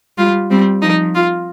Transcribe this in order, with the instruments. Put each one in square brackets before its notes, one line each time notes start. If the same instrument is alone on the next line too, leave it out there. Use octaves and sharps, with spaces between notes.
[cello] G3 [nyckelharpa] F4
[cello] G3 [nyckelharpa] C4
[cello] F3 [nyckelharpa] D#4
[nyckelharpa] F4